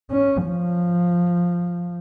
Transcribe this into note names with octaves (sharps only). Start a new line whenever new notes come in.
C#4
F3